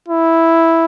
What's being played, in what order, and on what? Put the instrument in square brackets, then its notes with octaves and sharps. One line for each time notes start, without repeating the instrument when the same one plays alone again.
[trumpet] E4